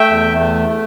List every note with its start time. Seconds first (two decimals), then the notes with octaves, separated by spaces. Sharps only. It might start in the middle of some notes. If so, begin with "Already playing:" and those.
Already playing: A3 E5 G5
0.10 E2
0.39 A3
0.68 A3